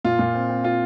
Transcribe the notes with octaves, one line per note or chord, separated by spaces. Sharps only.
A#2 F4
A#2
C4
C4
C4 F4